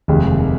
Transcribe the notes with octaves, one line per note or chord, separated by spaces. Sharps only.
F1 D#2 D#3 G#3